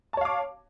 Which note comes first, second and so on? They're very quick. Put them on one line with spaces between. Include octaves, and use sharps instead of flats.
A5 C#5 F5 D6